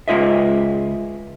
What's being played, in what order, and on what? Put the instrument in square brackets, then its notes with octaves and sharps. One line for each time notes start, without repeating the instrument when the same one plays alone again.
[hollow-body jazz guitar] C#2 G#3 F4 D#5 E5